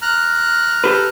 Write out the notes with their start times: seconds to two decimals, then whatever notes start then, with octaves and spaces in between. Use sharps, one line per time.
0.02 A#5 F6 F#6
0.84 G4 A4 B4